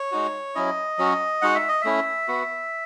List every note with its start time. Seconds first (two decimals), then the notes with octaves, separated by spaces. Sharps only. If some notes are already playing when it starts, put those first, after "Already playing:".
Already playing: C#5
0.12 G#3 D#4 F#4
0.55 F#3 C#4 E4 D#5
0.98 F#3 C#4 F#4
1.42 G#3 D#4 F#4 F#5
1.55 E5
1.68 D#5
1.82 A3 C#4 E4 E5
2.28 B3 F#4